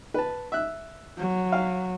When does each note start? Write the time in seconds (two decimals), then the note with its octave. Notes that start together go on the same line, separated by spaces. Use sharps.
0.14 B4 A5
0.52 E5 F#6
1.18 F#3
1.52 F5